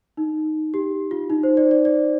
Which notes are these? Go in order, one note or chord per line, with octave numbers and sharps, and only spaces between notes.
D#4
G4
F4
D#4
C5
D5
D5
D5